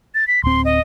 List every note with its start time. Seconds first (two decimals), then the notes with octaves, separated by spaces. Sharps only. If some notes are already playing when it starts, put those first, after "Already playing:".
0.15 A6
0.28 B6
0.44 D1 C4 C6
0.65 D#5